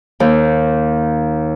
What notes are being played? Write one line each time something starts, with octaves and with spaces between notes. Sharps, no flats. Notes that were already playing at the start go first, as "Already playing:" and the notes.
D#2